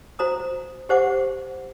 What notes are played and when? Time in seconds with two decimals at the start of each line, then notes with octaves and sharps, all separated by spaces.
0.19 F#4 C5 A#5 D#6
0.89 G4 C5 F#5 D6